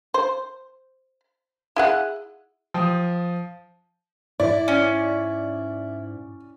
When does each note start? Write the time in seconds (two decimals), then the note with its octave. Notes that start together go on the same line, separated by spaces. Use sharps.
0.14 C5
1.76 E4 G#4 F#5
2.74 F3 G5 D#6
4.40 G#2 E4 D5
4.68 C#4